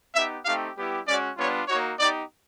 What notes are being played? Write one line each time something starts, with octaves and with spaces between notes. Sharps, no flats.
B3 D#4 G4 E5
A3 C4 D#4 G4 F5
G3 B3 E4 G4
G#3 C#4 F#4 D5
G3 B3 D4 F4 C#5
A#3 D#4 F#4 C#5
B3 D#4 G4 D5